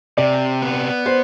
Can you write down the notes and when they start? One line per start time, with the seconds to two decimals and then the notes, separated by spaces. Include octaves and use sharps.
0.18 C3 D5
0.62 B3
1.06 C5